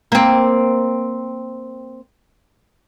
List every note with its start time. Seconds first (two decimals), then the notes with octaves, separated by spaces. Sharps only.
0.12 A#3 C4